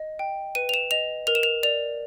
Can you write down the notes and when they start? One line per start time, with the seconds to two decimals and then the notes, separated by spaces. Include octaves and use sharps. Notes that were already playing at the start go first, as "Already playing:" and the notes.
Already playing: D#5
0.19 G5
0.55 B4 D#7
0.69 F7
0.74 E7
0.91 D#5 F7
1.27 A#4 F7
1.35 E7
1.43 F7
1.63 D5 F7